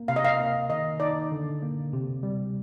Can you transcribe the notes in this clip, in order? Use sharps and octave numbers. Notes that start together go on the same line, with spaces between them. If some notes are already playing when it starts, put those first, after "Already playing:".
Already playing: A#3
C3 F5
D#5
F5
A#3
D#3 D#5
D#4 D5
D3
A#3
C3
G3